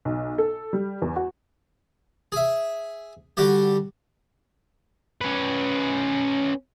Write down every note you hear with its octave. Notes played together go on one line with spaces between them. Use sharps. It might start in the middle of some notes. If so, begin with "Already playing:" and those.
B1
A4
G3
E2
F#4
G#4 E5
D3 G3 F#4 G4
C#4 B4